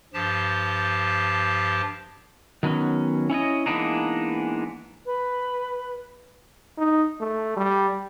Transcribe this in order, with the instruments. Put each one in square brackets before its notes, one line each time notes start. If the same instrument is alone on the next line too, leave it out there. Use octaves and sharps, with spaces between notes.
[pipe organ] G2 F3 G4 A5
[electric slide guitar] D#3 F#3 B3 C#4
C#4 E4 C#5 D#5
E3 G#3 A#3 B3 D4 D#4
[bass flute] B4
[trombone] D#4
A3
G3